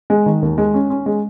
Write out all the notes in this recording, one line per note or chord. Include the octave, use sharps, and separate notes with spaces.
G#3
D#3
D#2
G#3
C#4
C#4
G#3